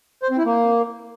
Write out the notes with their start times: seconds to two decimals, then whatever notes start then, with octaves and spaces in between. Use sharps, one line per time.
0.23 C5
0.30 C4
0.38 E4
0.45 A#3